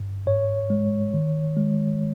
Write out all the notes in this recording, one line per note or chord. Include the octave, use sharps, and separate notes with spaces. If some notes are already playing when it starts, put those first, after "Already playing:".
Already playing: G1 G2
G#2 C#5
G#3
D#3
G#3